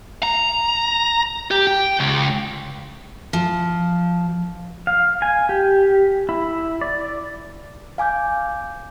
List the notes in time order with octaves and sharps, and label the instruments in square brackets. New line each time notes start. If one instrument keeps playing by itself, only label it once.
[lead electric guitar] A#5
G4
G5
C#2
[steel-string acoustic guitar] F3
[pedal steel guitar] F5
G#5
G4
E4
D5
[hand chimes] F5 G#5 D6 G6